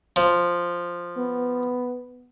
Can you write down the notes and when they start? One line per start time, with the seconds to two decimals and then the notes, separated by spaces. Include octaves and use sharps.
0.16 F3
1.17 B3